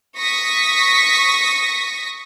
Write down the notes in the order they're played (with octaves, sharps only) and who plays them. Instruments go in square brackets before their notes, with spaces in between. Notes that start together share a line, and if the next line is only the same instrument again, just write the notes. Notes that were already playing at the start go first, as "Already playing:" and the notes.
[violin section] C#6 D#6 A#6 B6